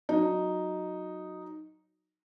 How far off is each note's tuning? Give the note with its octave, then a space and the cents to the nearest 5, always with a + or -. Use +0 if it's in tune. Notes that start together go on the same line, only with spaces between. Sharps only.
F#3 +0 D#4 +0